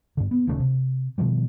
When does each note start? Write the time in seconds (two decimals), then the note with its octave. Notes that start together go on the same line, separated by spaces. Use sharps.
0.17 G2 D3
0.31 B3
0.47 D#1 D#2 C#3 A3
0.60 C3
1.18 B2 D#3 F3 G3